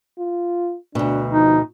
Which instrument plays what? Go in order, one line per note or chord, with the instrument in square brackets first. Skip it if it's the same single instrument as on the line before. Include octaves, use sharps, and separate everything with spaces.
[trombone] F4
[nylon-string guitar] D2 B2 [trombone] D4
[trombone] F3 [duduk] D#4